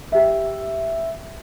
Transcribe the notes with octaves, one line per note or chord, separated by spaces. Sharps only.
G4 E5